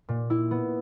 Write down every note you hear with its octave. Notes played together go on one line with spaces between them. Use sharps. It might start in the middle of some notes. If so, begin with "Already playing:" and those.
A#2
E4
B3